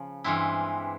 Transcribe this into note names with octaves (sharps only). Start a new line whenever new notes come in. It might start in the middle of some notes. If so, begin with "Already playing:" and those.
Already playing: C#3 F3
G2 E3 G#3 C4 E4